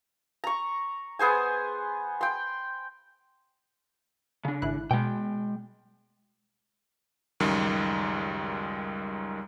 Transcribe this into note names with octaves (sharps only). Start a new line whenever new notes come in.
A#5 C#6
B3 G#4 C5 G#5
G5 C6
C#3 D4
G#1 E4 F#6
B2 G#3 G5
C#2 F#2 D#3 G3